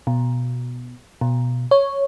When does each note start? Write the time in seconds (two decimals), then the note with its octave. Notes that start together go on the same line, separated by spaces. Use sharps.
0.07 B2
1.21 B2
1.71 C#5